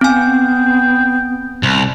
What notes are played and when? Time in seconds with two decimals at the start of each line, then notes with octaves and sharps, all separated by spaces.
0.01 B3 C4 G5 G#5
1.63 C2